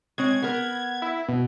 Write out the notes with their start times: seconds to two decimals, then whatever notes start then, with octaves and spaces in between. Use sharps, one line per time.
0.18 G#3 C4 C#5 G#6
0.42 B3 A#4
1.02 E4
1.28 B2